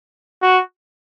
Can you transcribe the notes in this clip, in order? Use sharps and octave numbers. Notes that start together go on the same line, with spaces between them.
F#4